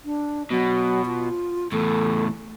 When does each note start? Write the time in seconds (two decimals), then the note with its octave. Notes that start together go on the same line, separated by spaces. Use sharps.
0.05 D4
0.51 B2 F#3
1.06 F4
1.72 E2 A2 A4